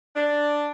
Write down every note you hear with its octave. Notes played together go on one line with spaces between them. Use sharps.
D4